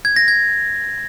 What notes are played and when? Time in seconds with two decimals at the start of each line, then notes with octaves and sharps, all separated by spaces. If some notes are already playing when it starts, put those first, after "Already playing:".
0.05 G#6
0.16 A#6
0.28 G#6